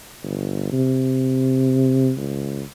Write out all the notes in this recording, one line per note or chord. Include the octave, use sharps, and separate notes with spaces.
G1
C3
C#2